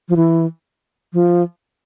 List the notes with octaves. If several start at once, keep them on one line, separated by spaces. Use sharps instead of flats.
F3
E3
F3